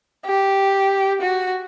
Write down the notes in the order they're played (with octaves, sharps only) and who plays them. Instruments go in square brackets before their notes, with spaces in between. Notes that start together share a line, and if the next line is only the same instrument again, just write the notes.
[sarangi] G4
F#4